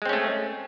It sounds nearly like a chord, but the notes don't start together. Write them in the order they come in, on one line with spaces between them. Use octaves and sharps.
G#3 C4 C#4 A3